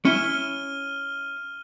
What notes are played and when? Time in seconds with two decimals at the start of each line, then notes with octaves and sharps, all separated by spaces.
0.05 C#4 E4 F6 D#7 G7